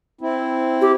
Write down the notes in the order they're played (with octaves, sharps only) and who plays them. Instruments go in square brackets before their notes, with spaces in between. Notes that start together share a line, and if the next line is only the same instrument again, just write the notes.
[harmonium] C4 E4
[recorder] G4